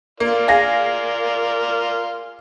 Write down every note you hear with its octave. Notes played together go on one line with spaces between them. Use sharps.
A#3 F4 A#4 D5
G#4 F5 A#6